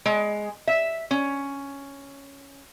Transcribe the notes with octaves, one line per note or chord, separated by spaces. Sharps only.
G#3
E5
C#4